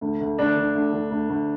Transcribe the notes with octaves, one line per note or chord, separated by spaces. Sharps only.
D2
D2
D2 D4
D3
D2
D3
D2
D2